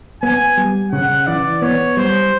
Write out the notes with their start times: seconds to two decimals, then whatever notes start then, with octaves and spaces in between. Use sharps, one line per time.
0.22 B3 G#5
0.57 G3
0.92 C#3 F#5
1.27 E3 D5
1.62 B3 C#5
1.97 G3 C5